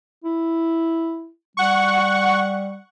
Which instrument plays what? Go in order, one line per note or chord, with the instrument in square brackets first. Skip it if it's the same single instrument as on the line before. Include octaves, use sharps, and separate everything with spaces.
[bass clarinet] E4
[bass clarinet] G3 [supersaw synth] F#5 C#6